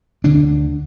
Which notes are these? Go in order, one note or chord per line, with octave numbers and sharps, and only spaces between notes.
D2 D3 D4